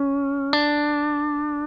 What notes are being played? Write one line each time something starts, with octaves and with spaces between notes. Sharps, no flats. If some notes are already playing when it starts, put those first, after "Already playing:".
Already playing: C#4
D4